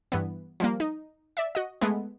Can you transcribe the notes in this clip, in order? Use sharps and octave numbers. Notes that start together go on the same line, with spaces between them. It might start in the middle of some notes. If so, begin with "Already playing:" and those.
G2 E3 B3
F3 G3 A#3
D#4
D5 E5
F#4 D#5
G#3 A3 B3